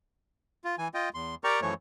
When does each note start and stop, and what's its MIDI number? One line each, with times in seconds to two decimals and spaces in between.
0.64 0.76 65
0.78 0.88 52
0.78 0.88 80
0.94 1.09 65
0.94 1.09 75
0.94 1.09 79
1.14 1.35 40
1.14 1.35 84
1.44 1.60 67
1.44 1.60 70
1.44 1.60 74
1.44 1.60 79
1.44 1.60 82
1.44 1.60 85
1.62 1.74 42
1.62 1.74 52
1.62 1.74 53
1.62 1.74 57
1.62 1.74 73